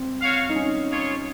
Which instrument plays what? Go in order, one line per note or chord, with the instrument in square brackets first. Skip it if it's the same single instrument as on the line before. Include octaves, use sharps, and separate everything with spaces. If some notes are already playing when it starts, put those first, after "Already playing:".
Already playing: [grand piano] C4
[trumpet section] F#4 C#5 F5
[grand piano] D#4
C#4
[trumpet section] A#3 F4 G#4 C#5